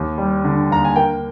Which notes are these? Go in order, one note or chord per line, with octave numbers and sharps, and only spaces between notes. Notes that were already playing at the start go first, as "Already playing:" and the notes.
Already playing: D#2
G3
D3
D#2 A#5
G#5
A#3 G5